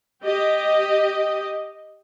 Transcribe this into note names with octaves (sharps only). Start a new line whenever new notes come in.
G4 D#5